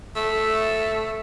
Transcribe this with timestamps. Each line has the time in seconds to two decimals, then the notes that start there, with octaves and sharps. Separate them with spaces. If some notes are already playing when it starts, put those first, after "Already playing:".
0.16 A3